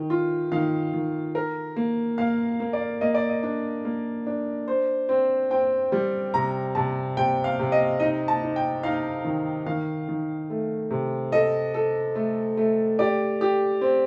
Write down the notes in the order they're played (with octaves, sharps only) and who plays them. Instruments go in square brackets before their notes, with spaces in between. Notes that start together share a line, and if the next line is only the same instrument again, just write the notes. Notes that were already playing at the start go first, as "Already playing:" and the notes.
Already playing: [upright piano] D#3
F4
[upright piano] D#3 [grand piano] F5
[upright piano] D#3
A#4
A#3
[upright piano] A#3 [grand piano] F5
[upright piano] A#3
[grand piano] D5
[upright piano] A#3 [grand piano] D#5
[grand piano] D5
D#5
[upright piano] D4
A#3
D4
C5
C4
[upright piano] C4 [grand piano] G5
[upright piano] G3
[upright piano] C3 [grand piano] A#5
[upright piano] C3 [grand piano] A5
[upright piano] C3 [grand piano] G5
[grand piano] F5
[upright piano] C3
[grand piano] D#5
[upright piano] D#4 [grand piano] D#5
[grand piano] A5
[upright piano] D#4
[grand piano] G5
[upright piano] D#4 [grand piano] F5
[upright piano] D#3
[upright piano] D#3 [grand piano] F5
[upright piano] D#3
A3
C3
[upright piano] A4 [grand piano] D#5
[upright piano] A4
A3
A3
[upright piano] G4 [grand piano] D5
[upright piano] G4
C4